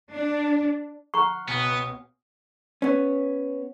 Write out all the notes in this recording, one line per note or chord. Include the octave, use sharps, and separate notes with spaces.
D4
F#5 A#5 C#6 F6 C7
C#2 B2 B3 G#5 D#6
B3 C#4